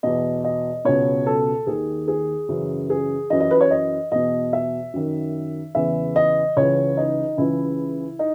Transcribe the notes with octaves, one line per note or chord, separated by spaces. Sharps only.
E2 B2 D#5
D#5
C#2 B2 C#5
A4
D#2 D#3 G#4
G#4
F#2 C#3 E3
G#4
F#2 E3 D#5
D#5
B4
C#5
D#5
E2 B2 D#5
E5
F#2 D#3
E2 C#3 E3 E5
D#5
C#2 C#3 E3 C#5
D#4
C#2 C#3 E3 E4
D#4